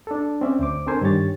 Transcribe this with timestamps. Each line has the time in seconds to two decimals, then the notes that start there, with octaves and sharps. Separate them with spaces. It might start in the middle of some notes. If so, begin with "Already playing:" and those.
0.07 D4 A4
0.41 C4 C#4 D5 E5
0.59 D2 C5 D6
0.87 C4 D4 A4 A#4 C5 G#5
1.02 G2 D#3 G4 C#5 A6